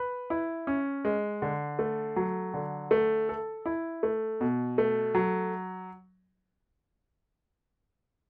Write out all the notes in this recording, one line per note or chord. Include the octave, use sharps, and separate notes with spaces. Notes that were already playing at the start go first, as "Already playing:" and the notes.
Already playing: B4
E4
C#4
G#3
D3
A3
F#3
D3
A3
A4
E4
A3
B2
A3
F#3